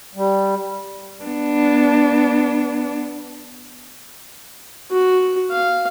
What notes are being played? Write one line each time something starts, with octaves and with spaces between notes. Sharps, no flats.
G3
B3 D4
F#4
F5